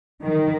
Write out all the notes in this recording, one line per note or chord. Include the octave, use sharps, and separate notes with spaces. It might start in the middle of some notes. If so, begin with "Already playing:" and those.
D#3